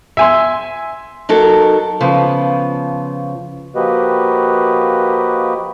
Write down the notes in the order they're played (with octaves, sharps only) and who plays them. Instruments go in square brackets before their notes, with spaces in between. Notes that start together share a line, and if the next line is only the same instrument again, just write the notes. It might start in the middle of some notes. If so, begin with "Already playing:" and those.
[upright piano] E5 G#5 C6
[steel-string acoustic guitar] F#3 D#4 A4 A#4
C#3 F3 B3
[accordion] F3 A#3 F#4 G4 B4 D#5